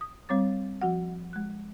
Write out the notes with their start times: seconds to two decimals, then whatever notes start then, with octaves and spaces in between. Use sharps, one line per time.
0.01 D#6
0.29 G3 C4 C#5 D6 A6
0.81 F3 F#4 F#5
1.33 G#3 F#6